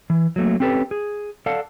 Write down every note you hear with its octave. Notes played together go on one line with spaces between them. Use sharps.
E3
F#3 A3 A#3
C4 C#4 G4 A4 B4
G#4
A4 D5 F5 F#5 A5